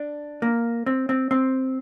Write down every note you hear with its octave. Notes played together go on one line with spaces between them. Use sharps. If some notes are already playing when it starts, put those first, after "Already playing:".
Already playing: D4
A#3
C4
C4
C4